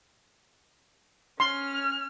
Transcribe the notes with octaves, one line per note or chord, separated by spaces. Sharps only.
C#4 C6 F6